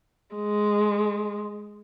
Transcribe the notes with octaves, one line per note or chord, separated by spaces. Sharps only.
G#3